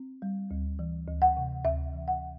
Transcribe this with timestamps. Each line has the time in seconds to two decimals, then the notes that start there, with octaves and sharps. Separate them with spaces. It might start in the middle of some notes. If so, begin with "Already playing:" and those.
Already playing: C4
0.22 G3
0.51 D2
0.79 E3
1.08 D2
1.22 F#5
1.37 C3
1.65 D2 E5
1.93 E3
2.08 F#5